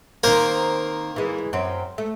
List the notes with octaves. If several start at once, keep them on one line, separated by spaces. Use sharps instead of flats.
D#3 A#3 C4 A#4 C5
E3 G#3
F#2 C4
A3